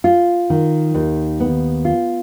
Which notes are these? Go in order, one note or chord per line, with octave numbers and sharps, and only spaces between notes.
F4
D#3
D#2
B3
F4